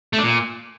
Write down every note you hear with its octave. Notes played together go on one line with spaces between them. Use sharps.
A3
D4
A#2